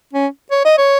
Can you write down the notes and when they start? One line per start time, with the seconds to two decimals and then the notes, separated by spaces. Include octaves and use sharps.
0.14 C#4
0.52 C#5
0.65 D#5
0.78 C#5